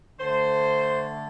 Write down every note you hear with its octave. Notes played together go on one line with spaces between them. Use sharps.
D3 A3 C5